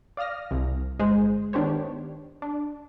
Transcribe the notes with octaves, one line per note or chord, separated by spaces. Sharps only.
D5 F5 D#6 F6 A#6
C2
G1 G#3 G#4 C5
D#3 B3 D4 G4 C5 C#5
D4